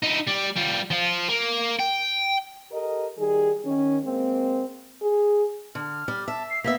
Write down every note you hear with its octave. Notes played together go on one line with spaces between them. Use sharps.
D#4 E4
G3
G3 F4
F3 F4
A#3
G5
G4 A4 A#4 D#5
D#3 G3 G#4
D#3 C#4
G#3 A#3 C4
G#4
D3 F6
G3
E5 A5
C7
A#3 B3 E5 B6